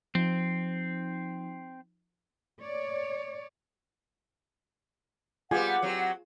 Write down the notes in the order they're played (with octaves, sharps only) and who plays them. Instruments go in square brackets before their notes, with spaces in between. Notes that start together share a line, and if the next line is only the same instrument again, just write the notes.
[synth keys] F3 D#4 [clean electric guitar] C4
[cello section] C#5 D5
[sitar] G3 B3 [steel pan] F4 G#4 G#5 [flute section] F#5
[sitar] F#3 C4